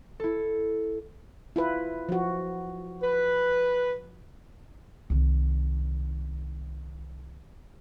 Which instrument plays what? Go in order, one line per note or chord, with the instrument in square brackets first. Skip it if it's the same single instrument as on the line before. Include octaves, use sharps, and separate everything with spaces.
[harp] E4 A4
[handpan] E4 F4 B4
F3 F#4
[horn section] B4
[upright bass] C2 D#3